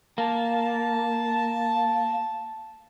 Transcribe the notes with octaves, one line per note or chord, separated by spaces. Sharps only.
A#3 A5